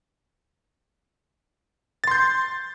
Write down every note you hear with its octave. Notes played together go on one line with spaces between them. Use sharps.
C6 G6 A6